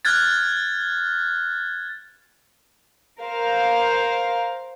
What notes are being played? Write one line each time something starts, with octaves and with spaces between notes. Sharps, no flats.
F6 F#6 G#6 A6
A#4 C5 F5